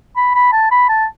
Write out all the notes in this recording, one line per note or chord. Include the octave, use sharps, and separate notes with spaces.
B5
B5
A5
B5
A5